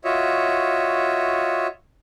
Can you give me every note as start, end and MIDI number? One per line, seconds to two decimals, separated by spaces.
0.05 1.67 65
0.05 1.67 66
0.05 1.67 73
0.05 1.67 75
0.05 1.67 76